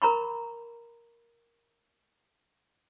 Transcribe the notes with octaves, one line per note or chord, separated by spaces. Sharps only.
A#4 A#5 B5 C#6